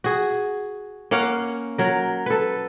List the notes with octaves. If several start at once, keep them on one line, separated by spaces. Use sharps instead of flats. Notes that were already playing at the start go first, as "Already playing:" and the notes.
F#4 G#4
A#3 C#4 F5 F#5
F#3 A#4
A4 B4